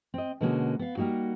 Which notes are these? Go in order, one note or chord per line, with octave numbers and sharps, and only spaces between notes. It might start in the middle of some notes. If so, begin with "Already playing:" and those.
C4 D#5
B2 D3 G#3 A#3 C#4 F#4
B3 F5
G3 A#3 D#4 F#4